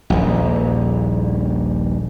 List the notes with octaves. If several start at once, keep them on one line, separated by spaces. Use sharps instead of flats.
D#1 A#1